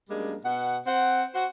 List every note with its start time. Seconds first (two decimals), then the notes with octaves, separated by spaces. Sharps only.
0.10 F#2 G3 G#3 A#3 D4
0.45 B2 F#5
0.87 C4 F#5
1.34 F#4 C5 F#5